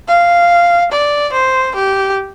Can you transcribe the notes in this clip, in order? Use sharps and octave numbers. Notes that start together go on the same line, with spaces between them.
F5
D5
C5
G4